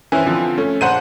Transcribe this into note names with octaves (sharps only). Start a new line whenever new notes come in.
E3 C#4 E4 C5
D3 F3 C4
A3 C#4
A#1 C5 F#5 D#7